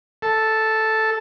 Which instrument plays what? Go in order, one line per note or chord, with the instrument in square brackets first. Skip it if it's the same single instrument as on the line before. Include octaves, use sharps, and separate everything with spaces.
[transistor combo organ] A4